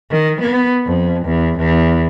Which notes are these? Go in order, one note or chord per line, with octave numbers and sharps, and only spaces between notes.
D#3
B3
F2
E2
E2